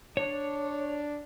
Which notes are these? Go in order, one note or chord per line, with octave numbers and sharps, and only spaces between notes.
D4 C#5